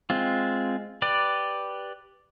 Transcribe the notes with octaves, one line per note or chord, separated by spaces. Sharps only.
G#3 C4 F4
G4 B4 D5